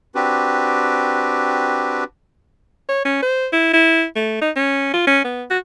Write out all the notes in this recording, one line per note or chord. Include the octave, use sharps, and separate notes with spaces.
C4 D4 F#4 G4 B4
C#5
C#4
C5
E4
E4
A3
D#4
C#4
F4
C#4
B3
F#4